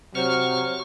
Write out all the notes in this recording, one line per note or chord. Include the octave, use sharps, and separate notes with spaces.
C3 F#3 C5 C#6 F6